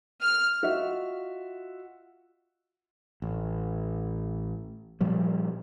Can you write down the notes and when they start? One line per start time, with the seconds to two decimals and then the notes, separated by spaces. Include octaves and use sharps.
0.22 F6
0.62 F4 F#4 D#5 E5
3.22 A1
5.01 A#2 F3 G3